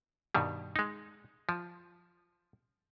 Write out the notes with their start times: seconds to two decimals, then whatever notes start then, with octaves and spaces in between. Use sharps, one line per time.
0.35 G2 B2 D#3 G3
0.76 G#3 D#4
1.49 F3